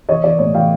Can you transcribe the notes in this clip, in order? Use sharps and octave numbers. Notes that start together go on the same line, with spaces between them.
E3 C#5 D#5
E3 D5
A2 C#5
E3 F5 G5